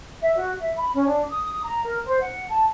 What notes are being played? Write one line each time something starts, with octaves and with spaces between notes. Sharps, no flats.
E5
F#4
E5
B5
C#4
D4
D#6
A#5
A#4
C5
F#5
A5